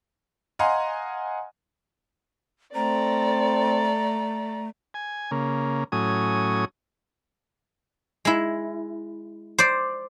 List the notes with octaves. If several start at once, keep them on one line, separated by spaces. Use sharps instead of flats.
D#5 F5 F#5 G#5 A#5 C6
A3 C4 A4 D5 A#5
G#5
C#3 A#3
A2 F#3 C#4 G#5 D#6
G#3 E4
C5 D5